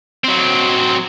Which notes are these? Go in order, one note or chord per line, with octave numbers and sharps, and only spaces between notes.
F#3 C4